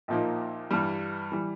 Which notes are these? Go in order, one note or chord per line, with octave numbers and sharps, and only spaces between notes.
A#1 A#2 F3 A#3 D#4
G2 E3 G3
E3 G3